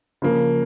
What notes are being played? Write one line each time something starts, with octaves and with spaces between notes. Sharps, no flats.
C#3 F3 A#3